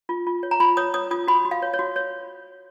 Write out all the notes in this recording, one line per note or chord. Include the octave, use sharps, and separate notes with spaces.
F4
F4
C#5
A#5
F4 B5
C#5 D#6
C#5 D#6
F4 D#6
F#4 B5
F#4
F5
C#5
C#5
F#4
C#5